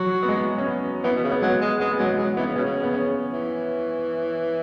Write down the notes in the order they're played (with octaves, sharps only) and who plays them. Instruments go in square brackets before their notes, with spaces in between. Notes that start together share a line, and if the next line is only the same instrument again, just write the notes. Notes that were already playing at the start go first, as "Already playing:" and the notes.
Already playing: [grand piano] F#3 [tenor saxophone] F#4
[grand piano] B3
G#3
C#4
B3
[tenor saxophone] E3 [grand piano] B3
[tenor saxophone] B2
C#3
[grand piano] B3
[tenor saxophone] F#3 [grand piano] G#3
[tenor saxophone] G#3
[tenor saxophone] G#3 [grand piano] B3
[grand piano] B3
[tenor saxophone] F#3 [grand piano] G#3
[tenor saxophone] F#3 [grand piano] G#3
[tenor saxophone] E3 [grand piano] B3
[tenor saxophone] C#3
[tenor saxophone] B2 [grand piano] C#4
[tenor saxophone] C#3
[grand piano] B3
C#4
[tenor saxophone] E3